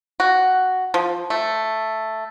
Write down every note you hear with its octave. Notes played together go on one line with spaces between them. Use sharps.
F#4
F3
A3